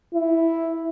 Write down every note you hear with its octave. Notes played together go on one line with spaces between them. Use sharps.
E4